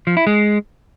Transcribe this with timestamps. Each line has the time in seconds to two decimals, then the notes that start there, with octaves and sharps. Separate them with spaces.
0.07 F3
0.17 E4
0.27 G#3